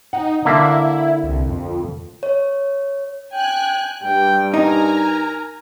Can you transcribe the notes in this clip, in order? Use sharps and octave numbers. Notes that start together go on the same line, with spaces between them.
D#4 F#5
D3 A#3 E4 E5
C2
F2
C#5
G5 G#5 F#6
G2 G3 G5
D#4 A#4 G#5 A#5